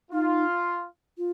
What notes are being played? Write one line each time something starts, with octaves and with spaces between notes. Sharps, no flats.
D#4 F4
F4